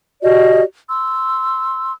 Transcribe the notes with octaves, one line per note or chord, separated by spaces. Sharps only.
F#4 G4 D5 D#5
C6 E6